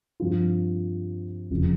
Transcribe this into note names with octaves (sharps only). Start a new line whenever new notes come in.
G2 F3 C4 F4
F1 F2 C#3 F3